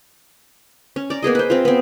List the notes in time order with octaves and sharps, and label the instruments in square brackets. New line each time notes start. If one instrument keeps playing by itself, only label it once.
[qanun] C#4
D5 A#5
A#3 B3 G#4 D#5
B4 C5
C4 F4
B3 C4